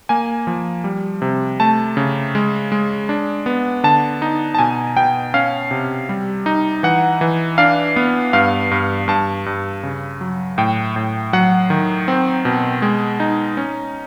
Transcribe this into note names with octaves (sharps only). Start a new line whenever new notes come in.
A#3 G#5
F3
G3
C3
A3 A5
C#3
G#3
G#3
D4
B3
D3 A5
D#4
A5
B2 G#5
B2 G5
C#4 F5
C3
G3
D#4
E3 F#5
E3
D4 F5
B3
G2 F5
G2
G2 A5
G2
C#3
F#3
A2 G5
A2
F#3 F#5
D#3
C4
B2
G#3
D#4
C#4